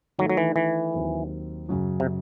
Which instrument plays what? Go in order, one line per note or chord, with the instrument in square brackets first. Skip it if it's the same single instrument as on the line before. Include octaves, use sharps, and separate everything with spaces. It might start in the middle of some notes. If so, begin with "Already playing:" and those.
[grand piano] D#3 A3 D#4 A4 [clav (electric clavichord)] F#3
[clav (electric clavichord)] F#3
E3
E3
[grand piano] D#2 D#3 F#3 C4
F#2 C#3 F#3
[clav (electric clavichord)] C3